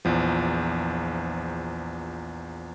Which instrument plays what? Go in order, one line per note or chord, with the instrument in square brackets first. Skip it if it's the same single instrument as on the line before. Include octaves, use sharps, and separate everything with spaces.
[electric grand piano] A#1 E2 F3